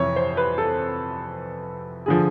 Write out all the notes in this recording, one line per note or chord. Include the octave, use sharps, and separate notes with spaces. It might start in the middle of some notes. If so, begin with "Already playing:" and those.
Already playing: F2 C3 E3 C#5
C5
B4
A4
D3 F3 G#4